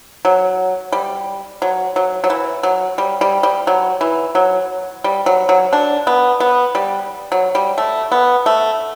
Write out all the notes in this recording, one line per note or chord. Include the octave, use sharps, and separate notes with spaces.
F#3
G3
F#3
F#3
F#3
E3
F#3
G3
G3
G3
F#3
E3
F#3
G3
F#3
F#3
D4
B3
B3
G3
F#3
G3
A3
B3
A3